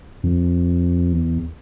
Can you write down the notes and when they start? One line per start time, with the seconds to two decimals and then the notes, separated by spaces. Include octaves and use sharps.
0.23 F2
1.13 E2